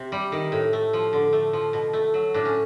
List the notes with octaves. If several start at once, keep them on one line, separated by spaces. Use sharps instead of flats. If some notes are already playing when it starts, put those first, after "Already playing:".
Already playing: C3
G3
D#3
A2
A3
F3
D3
A3
F3
B2
A3
F#3
A2 D4
C#4